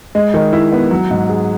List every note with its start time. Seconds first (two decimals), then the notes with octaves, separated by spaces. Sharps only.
0.15 G#3
0.34 D#3
0.53 E4
0.72 B3
0.91 F#3
1.11 G#2
1.29 G#4